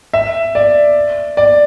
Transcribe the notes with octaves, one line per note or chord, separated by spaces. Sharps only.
E5
D5
D5